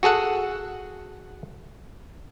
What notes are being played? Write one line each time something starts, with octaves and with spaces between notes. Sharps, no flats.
F#4 G#4 A4 F#5